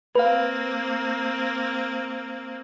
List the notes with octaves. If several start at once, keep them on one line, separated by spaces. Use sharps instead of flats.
A#3 C4 B4 F5